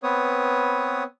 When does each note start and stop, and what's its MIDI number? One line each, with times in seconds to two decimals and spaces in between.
0.03 1.03 59
0.03 1.03 60
0.03 1.03 71
0.03 1.03 73
0.03 1.03 87